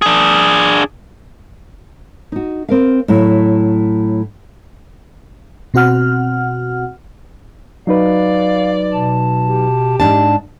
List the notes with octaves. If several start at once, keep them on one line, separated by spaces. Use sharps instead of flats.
D4 G#4
D#4 F#4
C4 A#4 F5
A2 F#3 E4
B2 C4 F#4 F#5 F6
F#3 D#4 B4 D5 F5
B2 A5
G4
G#2 D4 A5